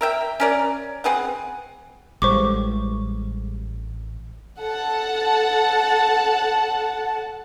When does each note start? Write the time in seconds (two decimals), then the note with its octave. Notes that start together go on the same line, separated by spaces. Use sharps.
0.01 A#4 E5 G5
0.40 C#4 A#4 D5
1.04 C4 G#4 B4 F#5
2.22 A1 G3 G#3 C5 C#6 D6
4.61 A4 F#5 A5